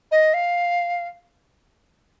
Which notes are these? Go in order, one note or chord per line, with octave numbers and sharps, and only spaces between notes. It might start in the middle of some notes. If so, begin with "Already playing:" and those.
D#5
F5